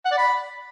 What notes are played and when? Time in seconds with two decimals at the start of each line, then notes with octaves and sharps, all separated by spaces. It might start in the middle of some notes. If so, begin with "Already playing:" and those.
0.05 F#5
0.11 D5
0.18 B5